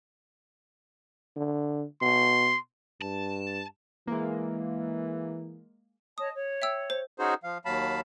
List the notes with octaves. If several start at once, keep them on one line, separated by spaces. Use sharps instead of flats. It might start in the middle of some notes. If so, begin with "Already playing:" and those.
D3
B2 C6
G2 A5
E3 G#3 A#3
C#5 D#5 A5 D#6
C#5
E5 G5 E6
C5
C#4 D#4 F#4 G#4 C5
F3 F5
D#2 F#3 F5 A5 B5